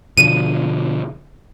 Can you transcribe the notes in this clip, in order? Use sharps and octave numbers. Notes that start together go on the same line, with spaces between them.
B2 D3 F3 D#7